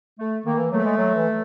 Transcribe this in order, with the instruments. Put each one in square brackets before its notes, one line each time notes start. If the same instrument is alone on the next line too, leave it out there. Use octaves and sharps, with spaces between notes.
[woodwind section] A3
[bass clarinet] D#3 [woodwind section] A#3
[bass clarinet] E3
[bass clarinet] F#3 [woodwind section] A3
[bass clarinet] G#3
F#3
E3